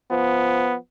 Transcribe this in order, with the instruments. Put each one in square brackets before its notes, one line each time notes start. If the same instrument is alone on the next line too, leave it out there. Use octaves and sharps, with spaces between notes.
[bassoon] F3 [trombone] B3